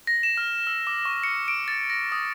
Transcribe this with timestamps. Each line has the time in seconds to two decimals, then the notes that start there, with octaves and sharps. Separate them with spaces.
0.07 A#6
0.23 E7
0.37 F6
0.67 E6
0.87 D6
1.05 C#6
1.24 C#7
1.48 D7
1.68 A6
1.90 A#6
2.12 D#6